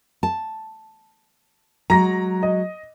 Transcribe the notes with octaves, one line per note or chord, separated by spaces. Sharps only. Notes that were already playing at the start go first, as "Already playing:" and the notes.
A5
F#3 G#3 A#5 A#6
D#5